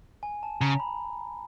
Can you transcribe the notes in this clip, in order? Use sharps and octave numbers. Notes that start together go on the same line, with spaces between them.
G#5
A5
C#3 A#5
B5